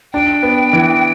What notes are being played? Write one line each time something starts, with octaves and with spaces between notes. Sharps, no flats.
D4 G5
B3
E3